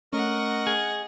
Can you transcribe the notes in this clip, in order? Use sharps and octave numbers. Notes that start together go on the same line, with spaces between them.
A3 C#4 A#4 D#5 F#5 C#6
G#4